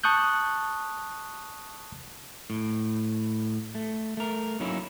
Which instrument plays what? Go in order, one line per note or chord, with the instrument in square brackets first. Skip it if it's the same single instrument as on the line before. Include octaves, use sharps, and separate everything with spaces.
[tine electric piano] A5 C#6 D#6 F#6 G6
[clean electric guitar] A2
A3
A3 A#4
F#3 A#3 C#4 D#4 E4